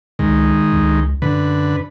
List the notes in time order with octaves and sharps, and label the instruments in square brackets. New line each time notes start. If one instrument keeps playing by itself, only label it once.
[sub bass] C#2 [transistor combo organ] D#3 G#3
[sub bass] C#2
[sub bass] F#2 [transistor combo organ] D3 B4